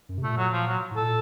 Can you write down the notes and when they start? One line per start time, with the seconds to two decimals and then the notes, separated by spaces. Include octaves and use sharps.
0.09 F#2
0.18 C3
0.23 A#2 A3
0.37 F#3
0.53 F3
0.67 F#3
0.91 A2
0.96 A4
1.02 A#2